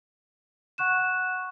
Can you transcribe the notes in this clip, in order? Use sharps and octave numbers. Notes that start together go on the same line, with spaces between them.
F#5 C#6 F#6 E7